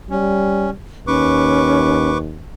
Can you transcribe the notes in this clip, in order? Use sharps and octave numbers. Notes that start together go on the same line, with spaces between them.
G3 C#4
D#2 C#4 B4 C#6 D6